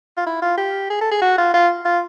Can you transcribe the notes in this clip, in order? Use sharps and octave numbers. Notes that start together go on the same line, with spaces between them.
F4
E4
F4
G4
G#4
A4
G#4
F#4
F4
F4
F4